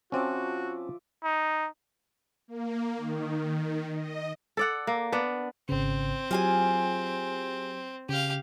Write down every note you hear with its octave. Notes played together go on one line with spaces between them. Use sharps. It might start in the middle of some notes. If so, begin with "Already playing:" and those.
F3 C4 C#4 F#4 D5 E5
D#4
A#3
D#3
D#5
A4 D5 F#5
A#3
B3 D4
G#1 C#3 C4
F#3 F4 G4 G#4 G#5
C#3 G4 F5